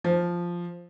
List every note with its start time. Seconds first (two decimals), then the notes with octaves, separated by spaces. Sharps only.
0.04 F3